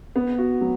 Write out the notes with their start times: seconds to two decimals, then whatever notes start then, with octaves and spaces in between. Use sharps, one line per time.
0.16 B3
0.38 F#4
0.61 F#3